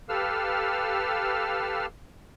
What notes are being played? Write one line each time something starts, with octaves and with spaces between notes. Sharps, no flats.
G4 A4 B4 F5 E6 F6